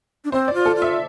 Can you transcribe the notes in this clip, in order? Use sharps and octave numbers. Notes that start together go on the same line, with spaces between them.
D4
C4 C5
D5
F4
A4
F4
E5